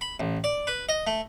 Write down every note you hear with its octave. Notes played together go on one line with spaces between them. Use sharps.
B5
A1
D5
B4
D#5
A3